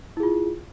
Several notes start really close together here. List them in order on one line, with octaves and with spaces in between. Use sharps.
E4 G#4 F4